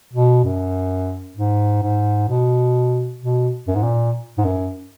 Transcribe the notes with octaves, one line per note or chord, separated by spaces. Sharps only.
B2
F#2
G#2
G#2
B2
B2
F#2
G#2
A#2
G#2
F#2